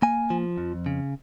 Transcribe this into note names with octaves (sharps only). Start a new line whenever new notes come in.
A#3 G#5
F3
F2
C#3